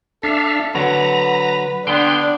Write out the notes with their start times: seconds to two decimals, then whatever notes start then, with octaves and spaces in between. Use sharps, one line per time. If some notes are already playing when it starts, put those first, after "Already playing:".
0.23 D4 A4 E5 F5
0.75 D3 F#3 B4 A#5
1.87 D3 B3 D4 G5 C6